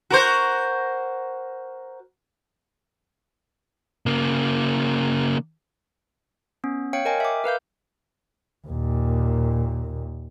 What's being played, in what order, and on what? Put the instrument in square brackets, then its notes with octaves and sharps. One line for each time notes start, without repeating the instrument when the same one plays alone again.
[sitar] F#4 A#4 C5
[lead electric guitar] C#3 A#3
[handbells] B3 C#4
C#5 F5 G5 C#7
A#4 D#5 G5 G#5
E5 D6
A#4 B4 F5 G6
[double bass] D#2 A#2